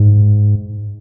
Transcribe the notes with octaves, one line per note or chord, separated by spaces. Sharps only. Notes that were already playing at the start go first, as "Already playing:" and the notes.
Already playing: G#2